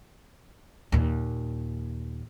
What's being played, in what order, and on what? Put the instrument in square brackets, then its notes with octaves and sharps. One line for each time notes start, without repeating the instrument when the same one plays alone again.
[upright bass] D#2 A#2